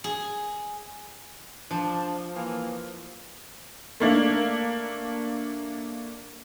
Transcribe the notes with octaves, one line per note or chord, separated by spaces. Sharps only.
G#4
F3 D4
E3 A#3
A3 A#3 D4